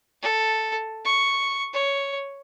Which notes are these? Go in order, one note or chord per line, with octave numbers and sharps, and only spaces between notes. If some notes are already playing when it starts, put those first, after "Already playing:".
A4
C#6
C#5